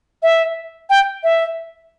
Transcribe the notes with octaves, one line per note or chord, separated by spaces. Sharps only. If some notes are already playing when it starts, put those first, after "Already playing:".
E5
G5
E5